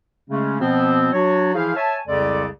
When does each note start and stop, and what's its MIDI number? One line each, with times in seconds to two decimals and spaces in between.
0.30 0.57 49
0.30 0.57 56
0.30 0.57 57
0.30 0.57 61
0.61 1.09 47
0.61 1.09 53
0.61 1.09 59
0.61 1.09 60
1.13 1.54 54
1.13 1.54 62
1.13 1.54 66
1.13 1.54 73
1.55 1.72 52
1.55 1.72 53
1.55 1.72 64
1.55 1.72 68
1.55 1.72 72
1.55 1.72 77
1.77 1.97 73
1.77 1.97 76
1.77 1.97 80
1.77 1.97 81
2.08 2.47 36
2.08 2.47 41
2.08 2.47 49
2.08 2.47 56
2.08 2.47 69
2.08 2.47 74